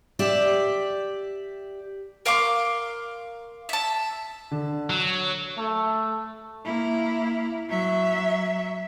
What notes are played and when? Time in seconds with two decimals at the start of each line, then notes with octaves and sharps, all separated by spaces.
0.19 G4 D5 E5
2.26 A#4 F5 C6 D6
3.69 E5 A5
4.51 D3
4.90 F#3 F#6
5.56 A3
6.65 A#3 E4
7.69 F#3 E5